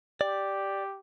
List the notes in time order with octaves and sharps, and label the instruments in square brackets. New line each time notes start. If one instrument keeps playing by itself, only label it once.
[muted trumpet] G4 [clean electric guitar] D5